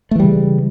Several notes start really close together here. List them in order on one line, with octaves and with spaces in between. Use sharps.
A3 E3 G3 C#3